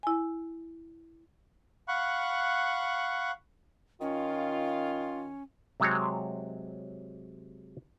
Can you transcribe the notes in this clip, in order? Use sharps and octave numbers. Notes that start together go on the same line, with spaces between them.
E4 G#5
F5 F#5 B5 C#6 F#6
D#3 C#4 F4
C3 F#3 G#3 C4 C#5